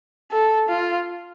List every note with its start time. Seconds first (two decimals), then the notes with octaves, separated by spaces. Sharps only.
0.31 A4
0.69 F4